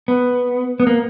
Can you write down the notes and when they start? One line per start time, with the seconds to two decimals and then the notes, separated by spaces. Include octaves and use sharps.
0.08 B3
0.80 B3
0.87 A#3